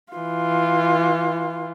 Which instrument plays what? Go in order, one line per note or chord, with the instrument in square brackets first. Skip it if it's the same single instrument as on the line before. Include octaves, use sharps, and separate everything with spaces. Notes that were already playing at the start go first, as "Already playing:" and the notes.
[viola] E3 F4